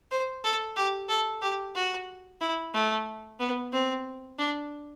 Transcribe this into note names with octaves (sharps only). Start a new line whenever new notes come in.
C5
A4
G4
A4
G4
F#4
E4
A3
B3
C4
D4